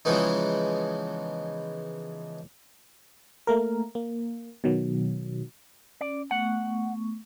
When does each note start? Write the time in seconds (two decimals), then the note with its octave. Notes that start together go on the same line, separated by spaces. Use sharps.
0.05 C#3 E3 F3 G#3 B3 D#4
3.47 A3 A#3 A#4
3.95 A#3
4.64 B2 D#3 F#3
6.01 C#4 D5
6.31 A3 B3 F#5 C#6